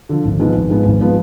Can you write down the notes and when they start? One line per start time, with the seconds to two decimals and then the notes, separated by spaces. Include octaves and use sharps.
0.09 D3 F3
0.25 G#1
0.39 G#2 F3 G#3 B3
0.55 G#1
0.70 G#2 F3 G#3 B3
0.86 G#1
1.01 F3 G#3 B3